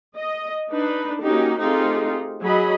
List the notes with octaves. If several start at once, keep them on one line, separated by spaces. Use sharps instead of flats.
D#5
D4 D#4 B4
A#3 C#4 D#4 F#4 G4
A3 C4 D#4 F4 G4 G#4
F#3 G#4 D#5 B5